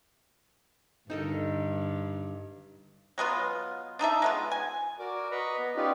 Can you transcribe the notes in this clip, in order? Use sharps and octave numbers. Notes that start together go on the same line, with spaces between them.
G2 D3 D#4 A4 A#4
F#3 G#3 B3 F4
D4 D#4 A4 E5
G#3 B3 F4
G#5
F#4 A#4 D5 D6
B4 D#5 A#5 B5 C#6
B3
C#4 D#4 F4 G4 B4 D5